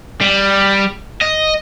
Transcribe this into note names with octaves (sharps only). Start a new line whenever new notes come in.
G3
D#5